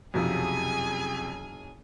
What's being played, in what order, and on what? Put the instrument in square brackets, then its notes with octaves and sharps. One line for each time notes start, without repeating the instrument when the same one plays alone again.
[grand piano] F#1 B1 F#4 [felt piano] F2 C3 F3 [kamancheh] G#4 G#5